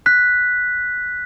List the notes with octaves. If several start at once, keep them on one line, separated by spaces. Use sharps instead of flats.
F#6 B6